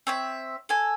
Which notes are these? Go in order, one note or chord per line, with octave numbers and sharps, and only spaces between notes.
C4 C#5 E5
A4 G#5